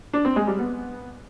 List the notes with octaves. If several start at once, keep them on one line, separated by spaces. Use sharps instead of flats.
D4
C4
G#3
G3
B3